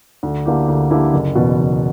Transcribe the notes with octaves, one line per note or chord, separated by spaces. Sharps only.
D2
D3 A#3 E4 G4
D2
D3 A#3 E4 G4
F#1
E2 B2
F#1